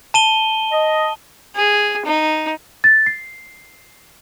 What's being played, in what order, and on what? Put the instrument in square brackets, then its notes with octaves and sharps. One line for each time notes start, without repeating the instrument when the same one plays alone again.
[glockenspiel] A5 D#7 G7
[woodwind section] D#5
[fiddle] G#4
D#4
[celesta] A6
C7